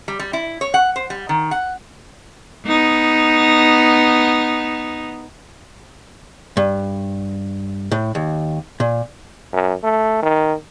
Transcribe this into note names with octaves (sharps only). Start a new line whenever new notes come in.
G3
G3
E4
C#5
F#5
C5
G3
D#3
F#5
B3 D#4
G2
A2
D#2
A#2
F#2
A3
D#3